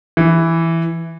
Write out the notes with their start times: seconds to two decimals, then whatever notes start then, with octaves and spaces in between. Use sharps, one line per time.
0.17 E3